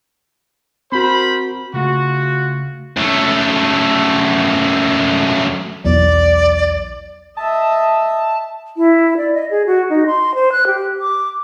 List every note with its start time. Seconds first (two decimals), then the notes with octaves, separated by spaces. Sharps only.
0.92 C4 F#4 A#4 C5 B5
1.74 C#3 A3 F4 F#4
2.97 F#2 A3
5.84 B1 E2 F#3 D5
7.37 D#5 E5 A5
8.77 E4
9.17 D5
9.34 D#5
9.51 G#4
9.66 F#4
9.90 D#4
10.06 C6
10.35 C5
10.52 F#6
10.67 G4
10.99 D6